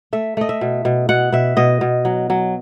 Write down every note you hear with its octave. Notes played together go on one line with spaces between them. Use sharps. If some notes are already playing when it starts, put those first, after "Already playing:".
A3 E5
A3 D#5
E5
B2
B2
B2 F#5
B2 E5
B2 D#5
B2
F#3
F#3